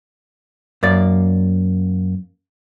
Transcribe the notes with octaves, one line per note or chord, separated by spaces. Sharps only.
F#2 A#3 D5